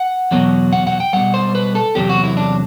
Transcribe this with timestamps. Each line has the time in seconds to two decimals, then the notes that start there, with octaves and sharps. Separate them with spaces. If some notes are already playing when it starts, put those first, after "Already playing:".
Already playing: F#5
0.31 E2 B2 F#3
0.73 F#5
0.87 F#5
1.00 G5
1.13 B2 G3 F#5
1.34 C5
1.55 B4
1.75 A4
1.95 E2 C3 F#3 G4
2.09 F#4
2.24 E4
2.37 D4